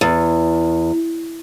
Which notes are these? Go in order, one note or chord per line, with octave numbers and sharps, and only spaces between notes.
E2